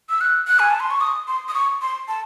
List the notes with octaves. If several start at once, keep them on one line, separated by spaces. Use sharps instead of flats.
E6
F#6
F#6
G#5
A5
C6
C#6
D#6
C6
D#6
C#6
C6
A5